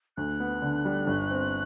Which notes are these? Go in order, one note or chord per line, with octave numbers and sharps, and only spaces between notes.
D2 F#6
B3
D3
G3
G1
C4